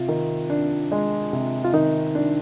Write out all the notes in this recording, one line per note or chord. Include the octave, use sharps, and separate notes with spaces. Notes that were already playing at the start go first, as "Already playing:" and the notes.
Already playing: C3 F4
D#3
D4
G#3
C3
F4
D#3 D#4
D4